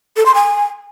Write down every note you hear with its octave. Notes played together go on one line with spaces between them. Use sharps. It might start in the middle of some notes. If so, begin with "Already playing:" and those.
A4
C6
G#5